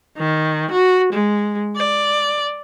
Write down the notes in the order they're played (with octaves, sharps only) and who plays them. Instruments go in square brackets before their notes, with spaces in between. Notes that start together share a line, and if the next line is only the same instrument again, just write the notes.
[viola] D#3
F#4
G#3
D5